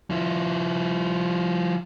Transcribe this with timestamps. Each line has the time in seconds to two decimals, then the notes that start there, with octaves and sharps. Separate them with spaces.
0.10 F3 E4